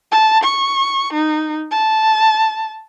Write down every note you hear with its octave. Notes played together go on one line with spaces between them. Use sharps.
A5
C#6
D#4
A5